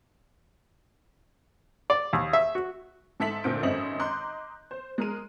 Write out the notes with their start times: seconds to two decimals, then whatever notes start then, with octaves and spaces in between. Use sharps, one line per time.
1.90 D5
2.13 D#2
2.33 E5
2.55 F#4
3.20 G#2 A4 E5 B6 F#7
3.44 D2 A#2 D3 C4 G6 D7
3.63 G#1 F#2 C4 D#5 E5 F#7
4.00 D#5 A#5 C6 D6 F#6 G6
4.71 C5
4.98 G#3 A#4 D#7